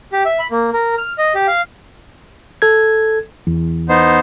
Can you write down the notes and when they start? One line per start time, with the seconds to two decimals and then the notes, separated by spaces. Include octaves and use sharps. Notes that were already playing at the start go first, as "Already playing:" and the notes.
0.13 G4
0.25 E5
0.39 B5
0.51 A#3
0.73 A#4
0.98 F6
1.18 D#5
1.35 G4
1.48 F5
2.62 A4 G#6
3.47 E2
3.89 B3 D#4 C5